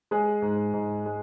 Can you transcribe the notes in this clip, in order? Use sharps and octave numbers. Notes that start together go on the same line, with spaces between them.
G#3 G#4
G#2
G#2
G#3